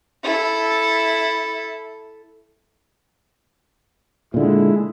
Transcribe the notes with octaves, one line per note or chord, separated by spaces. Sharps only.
E4 A4
A#2 D3 G#3 E4